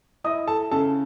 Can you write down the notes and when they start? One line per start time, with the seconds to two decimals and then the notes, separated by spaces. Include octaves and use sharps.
0.24 E4 D#5 D#6
0.47 A4 A5
0.71 C#3 A4 A5